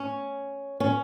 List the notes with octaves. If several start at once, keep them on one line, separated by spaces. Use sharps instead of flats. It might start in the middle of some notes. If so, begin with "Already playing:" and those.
Already playing: C#4
C#4